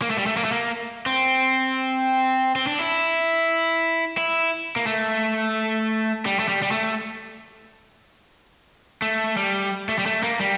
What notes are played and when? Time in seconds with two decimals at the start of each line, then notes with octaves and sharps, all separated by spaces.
0.02 A#3
0.10 A3
0.18 G3
0.27 A3
0.37 A#3
0.44 A3
0.52 A#3
1.06 C4
2.56 C4
2.67 D4
2.79 E4
4.18 E4
4.76 A#3
4.87 A3
6.26 G3
6.39 A3
6.49 G3
6.62 G3
6.71 A3
9.02 A3
9.37 G3
9.89 A3
9.99 G3
10.06 A3
10.23 A#3
10.41 G3